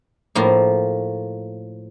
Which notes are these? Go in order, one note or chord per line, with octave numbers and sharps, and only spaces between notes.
A2 F3 A#3